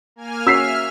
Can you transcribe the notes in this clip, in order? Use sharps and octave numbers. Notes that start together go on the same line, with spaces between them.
A#3 G#5 F6
C#4 F#4 E5 E6 F6 B6 C7